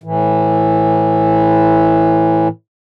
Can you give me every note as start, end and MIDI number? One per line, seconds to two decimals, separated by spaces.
0.03 2.48 45
0.03 2.48 52